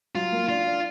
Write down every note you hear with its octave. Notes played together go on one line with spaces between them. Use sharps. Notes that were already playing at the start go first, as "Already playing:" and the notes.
F#3 F4
A#3
D4 F4
D4